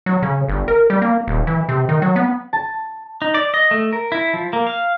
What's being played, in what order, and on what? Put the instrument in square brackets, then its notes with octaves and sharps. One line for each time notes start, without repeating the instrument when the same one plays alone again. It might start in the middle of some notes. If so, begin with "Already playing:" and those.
[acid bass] F#3
C#3
G1
A#4
G3
A#3
D#1
E3
C3
D#3
F#3
B3
[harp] A5
[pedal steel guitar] D#4
D5
D#5
A3
A#4
E4
F3
A#3
F5